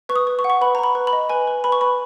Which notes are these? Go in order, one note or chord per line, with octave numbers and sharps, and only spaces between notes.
B4 C#6
D#6
B4
C#6
F#5
C#6
B4 B5
A#5
B4 B5
B4
B5
D#5
B4 G#5
B4
B4 B5
C#6
B4 B5